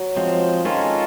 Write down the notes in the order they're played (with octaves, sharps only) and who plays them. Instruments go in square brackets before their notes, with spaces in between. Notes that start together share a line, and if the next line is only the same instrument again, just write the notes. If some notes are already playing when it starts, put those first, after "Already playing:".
Already playing: [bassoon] F#3
[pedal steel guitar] F3 G#3 C4
[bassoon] D#3 [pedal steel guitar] G#3 C#4 F4 A4